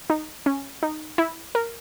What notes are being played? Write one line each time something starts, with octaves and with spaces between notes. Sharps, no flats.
D#4
C#4
D#4
E4
A#4